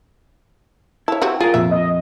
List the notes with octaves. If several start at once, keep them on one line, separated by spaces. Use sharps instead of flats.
E4 C#5 A5
C4 F#4 G4
F4 G#4 A#4
F2 A#2 E5
D#5